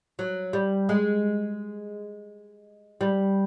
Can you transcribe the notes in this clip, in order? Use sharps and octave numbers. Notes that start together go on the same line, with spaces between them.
F#3
G3
G#3
G3